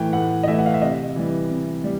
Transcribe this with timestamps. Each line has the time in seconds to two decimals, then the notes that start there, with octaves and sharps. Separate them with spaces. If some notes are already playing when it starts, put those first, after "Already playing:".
Already playing: A2 E3 A3 G5
0.13 A2 F#5
0.43 D#5
0.47 E3 A3 E5
0.59 F#5
0.66 F5
0.74 E5
0.82 C3 D#5
1.16 E3 G3
1.50 C3
1.84 G3